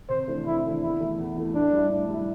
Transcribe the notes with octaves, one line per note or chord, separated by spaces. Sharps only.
C3 C5
E3 A3 D4
C3 E4
E3 A3 D4
E2 E4
E3 A3
E2
E3 A3
A2 D4
G3 E4
A2
G3 E4